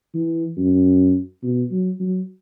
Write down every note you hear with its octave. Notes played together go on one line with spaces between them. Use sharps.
E3
F#2
B2
F#3
F#3